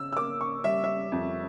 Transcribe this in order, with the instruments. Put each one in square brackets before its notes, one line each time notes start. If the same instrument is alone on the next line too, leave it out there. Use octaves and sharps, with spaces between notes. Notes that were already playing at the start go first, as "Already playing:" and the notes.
Already playing: [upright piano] C#3 E6
E6
A#3 D6
C#6
G3 E5
E5
F2